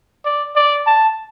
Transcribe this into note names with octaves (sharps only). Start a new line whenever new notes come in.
D5
D5
A5